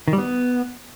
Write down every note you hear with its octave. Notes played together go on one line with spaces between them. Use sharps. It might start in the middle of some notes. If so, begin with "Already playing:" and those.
D#3
G3
B3